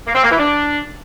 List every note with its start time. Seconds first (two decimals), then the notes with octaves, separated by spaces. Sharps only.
0.07 A#3
0.15 C4
0.23 A#3
0.31 E3
0.39 D4